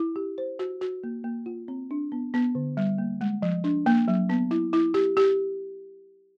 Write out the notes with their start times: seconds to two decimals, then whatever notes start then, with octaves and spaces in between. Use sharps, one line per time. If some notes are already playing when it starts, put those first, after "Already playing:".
Already playing: E4
0.16 G4
0.38 C5
0.59 F#4
0.81 F#4
1.04 A#3
1.24 A#3
1.46 F4
1.68 C4
1.91 D4
2.12 B3
2.34 B3
2.55 D3
2.77 G3
2.98 A#3
3.21 G#3
3.42 F3
3.64 D4
3.86 A#3
4.08 F#3
4.29 B3
4.51 E4
4.73 E4
4.94 G4
5.17 G4